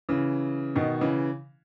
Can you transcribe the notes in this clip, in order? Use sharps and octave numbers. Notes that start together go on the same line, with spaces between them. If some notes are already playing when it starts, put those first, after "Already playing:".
C#3 E3
B2 D#3
C#3 E3